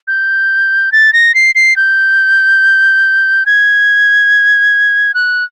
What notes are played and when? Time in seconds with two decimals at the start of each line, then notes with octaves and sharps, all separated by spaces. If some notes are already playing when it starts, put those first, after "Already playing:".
0.08 G6
0.92 A6
1.13 A#6
1.35 C7
1.55 C7
1.76 G6
3.46 G#6
5.14 F#6